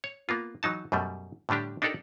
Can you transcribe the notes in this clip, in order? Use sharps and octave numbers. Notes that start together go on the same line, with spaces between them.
C#5
A#3 B3 F4
E3 F#3 D#4 A5
F#2 B2 G3 A3
A2 D3 G3 D4 G4
D4 D#4 G4 A4 A#4 D5